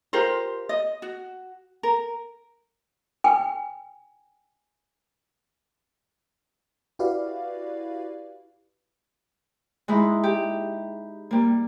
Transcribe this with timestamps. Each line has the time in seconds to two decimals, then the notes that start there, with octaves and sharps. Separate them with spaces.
0.13 F4 G4 A#4 C5
0.69 D#5
1.02 F#4
1.83 A#4
3.24 G5 G#5
6.99 E4 F#4 G4 B4 D5 F5
9.88 G#3 D#4 E4
10.23 G4
11.31 G3 A#3